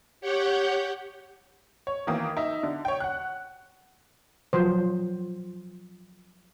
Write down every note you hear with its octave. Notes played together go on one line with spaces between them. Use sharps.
G4 C#5 F#5 G5
C#5
D#3 E3 A#3 D#6
D#4 E5
D3
C#5 G5
F#5 F#6
F3 F#3 C5